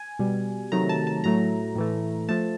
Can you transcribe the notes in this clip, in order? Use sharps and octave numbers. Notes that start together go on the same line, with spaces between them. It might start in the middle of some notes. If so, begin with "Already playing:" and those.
Already playing: G#5
B2 G3
C3 D#3 F#3 A3 A#5
A5
A5
A2 F#3 A3 A#5
A2 E3 A3
F3 A3 A5